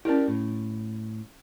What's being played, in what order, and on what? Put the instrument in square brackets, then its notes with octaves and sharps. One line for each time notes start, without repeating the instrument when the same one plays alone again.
[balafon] C#4 E4 [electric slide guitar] G4 A#4 D5
[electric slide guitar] A2